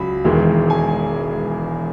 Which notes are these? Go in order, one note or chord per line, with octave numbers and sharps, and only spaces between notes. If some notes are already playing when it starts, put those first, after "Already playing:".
Already playing: C#2 F#3 B5
E1 E2 D#3 G#3
G#5